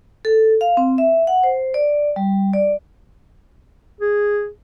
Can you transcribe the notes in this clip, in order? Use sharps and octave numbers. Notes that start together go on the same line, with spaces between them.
A4
F5
C4
E5
F#5
C5
D5
G3
D5
G#4